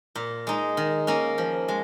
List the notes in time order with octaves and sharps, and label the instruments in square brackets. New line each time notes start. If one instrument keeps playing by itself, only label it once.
[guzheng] A#2
G#3 D#4
D#3
A#3 C#4
F3
G#3